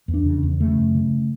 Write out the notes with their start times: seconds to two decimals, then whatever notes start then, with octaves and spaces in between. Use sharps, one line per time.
0.08 E2
0.14 D4
0.25 C#3
0.43 E2
0.60 C#3 A3
0.78 F#2
0.94 C#3